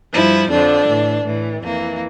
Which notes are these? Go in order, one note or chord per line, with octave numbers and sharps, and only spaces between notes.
G2 F3 E4
F2 D3 F3 D4
A2 E3
A2 E3
F2 E3 A#3